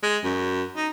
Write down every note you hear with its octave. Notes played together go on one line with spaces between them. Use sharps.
G#3
F#2
D#4